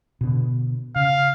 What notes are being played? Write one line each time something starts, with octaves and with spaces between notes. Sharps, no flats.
B2 D3
C#3 F5